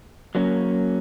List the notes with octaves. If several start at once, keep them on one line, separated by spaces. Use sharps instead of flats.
F#3 A#3 C#4